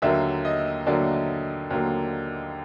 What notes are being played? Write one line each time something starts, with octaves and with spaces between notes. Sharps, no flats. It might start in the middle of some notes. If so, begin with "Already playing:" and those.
D#2 D3 F#3 A#3 E5
D#5
D#2 D3 F#3 A#3 D5
D#2 D3 F#3 A#3